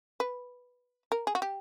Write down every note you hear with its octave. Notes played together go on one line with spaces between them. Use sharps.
B4
A#4
G#4
F#4
G4